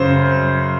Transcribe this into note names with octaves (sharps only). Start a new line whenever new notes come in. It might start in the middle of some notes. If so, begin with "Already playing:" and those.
Already playing: F#2 C#3 C5